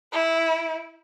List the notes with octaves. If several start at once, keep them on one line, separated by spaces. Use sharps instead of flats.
E4